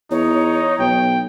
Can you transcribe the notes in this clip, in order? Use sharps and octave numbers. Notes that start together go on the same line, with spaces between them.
E2 D#4 C#5
B1 G5